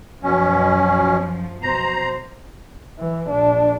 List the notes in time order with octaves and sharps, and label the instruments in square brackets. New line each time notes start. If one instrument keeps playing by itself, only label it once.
[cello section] F#2 F3 [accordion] B2 C#4
[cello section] B2 C5 [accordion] A#5
[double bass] E3
A#1 D4